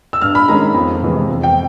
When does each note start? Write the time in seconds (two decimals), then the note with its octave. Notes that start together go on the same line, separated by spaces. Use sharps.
0.13 E6
0.21 G2 F6
0.35 B5
0.48 D#3 G#3 C#4 A#5
0.74 F2
1.02 C3 E3 G#3
1.28 F2
1.43 G5